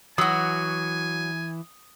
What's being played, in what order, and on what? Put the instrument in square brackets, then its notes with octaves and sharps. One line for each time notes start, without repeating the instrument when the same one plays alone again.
[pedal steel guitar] E3 [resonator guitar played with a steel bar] F#3 F#4 [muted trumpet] G#5 [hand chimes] D#6